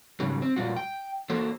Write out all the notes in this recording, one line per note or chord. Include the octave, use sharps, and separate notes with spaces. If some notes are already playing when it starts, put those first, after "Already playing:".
G#2 C#3 F#3 G3
C4
F#2 A#2 G3 F4 F#4
G5
A#3 F#4 A4 C5